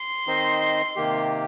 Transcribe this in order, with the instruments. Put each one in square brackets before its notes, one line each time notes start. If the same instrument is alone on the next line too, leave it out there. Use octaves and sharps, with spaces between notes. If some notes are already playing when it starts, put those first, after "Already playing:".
Already playing: [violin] C6
[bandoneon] D#3 C4 D#4 C5 D#5
C3 D#3 A#3 G4